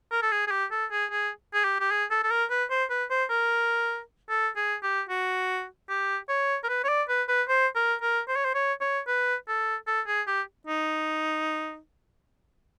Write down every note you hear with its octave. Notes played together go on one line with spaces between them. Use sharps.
A#4
A4
G#4
G#4
G4
A4
G#4
G#4
G#4
G4
G4
G#4
A4
A4
A#4
B4
C5
B4
C5
A#4
A4
G#4
G4
F#4
G4
C#5
A#4
B4
C#5
D5
B4
B4
C5
A#4
A#4
C5
C#5
C5
C#5
C#5
B4
A4
A4
G#4
G4
D#4